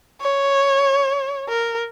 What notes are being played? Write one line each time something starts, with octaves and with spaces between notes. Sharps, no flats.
C#5
A#4